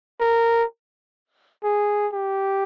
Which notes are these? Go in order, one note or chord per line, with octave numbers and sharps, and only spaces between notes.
A#4
G#4
G4